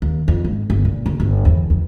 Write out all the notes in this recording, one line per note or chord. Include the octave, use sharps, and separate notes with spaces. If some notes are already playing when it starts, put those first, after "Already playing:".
D#2
F2
G#2
G1
A#2
F#1
G1
E2
F2